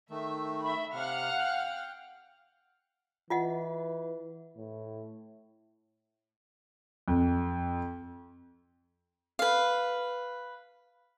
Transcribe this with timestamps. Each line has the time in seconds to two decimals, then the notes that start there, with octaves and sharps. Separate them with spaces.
0.10 D#3 A3 E5
0.61 E5 B5
0.94 C3 F5 F#5 F6
1.38 G5
3.30 E3 F4 D#5 F#5
4.57 A2
7.08 F2
9.39 B4 F5